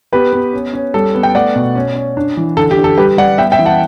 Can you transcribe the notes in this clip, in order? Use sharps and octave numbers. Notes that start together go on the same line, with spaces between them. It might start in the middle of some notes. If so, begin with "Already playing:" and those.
B3 G4 B4
B3
C#4
C#4
G3 A4
B3
G5
A3 D5 F#5
B2
C#4
C#4
D4
E3
D3 A4
G4
D3
A4
G3 G4 B4
G3 D5 F#5
B3 E5 G5
E5 G5
E3
F#5 A5